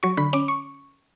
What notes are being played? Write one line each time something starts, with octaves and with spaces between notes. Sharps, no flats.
F#3 C#6
D3 B5
C#4 D6
C#6